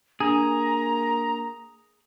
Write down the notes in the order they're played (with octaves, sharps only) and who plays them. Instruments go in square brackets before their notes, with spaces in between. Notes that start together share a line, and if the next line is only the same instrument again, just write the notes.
[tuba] A#3 [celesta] D4 [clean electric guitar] G#4 [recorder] A#5